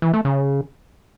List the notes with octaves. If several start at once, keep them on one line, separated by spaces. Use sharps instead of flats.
E3
A3
C#3